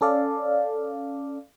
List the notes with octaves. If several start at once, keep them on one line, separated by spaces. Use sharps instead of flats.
C#4 A4 D5 F5